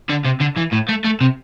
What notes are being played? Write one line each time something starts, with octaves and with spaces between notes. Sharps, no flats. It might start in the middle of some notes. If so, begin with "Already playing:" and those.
D3
C3
D3
E3
A2
A3
A3
C3